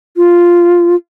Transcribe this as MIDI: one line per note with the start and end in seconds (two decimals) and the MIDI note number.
0.17 0.95 65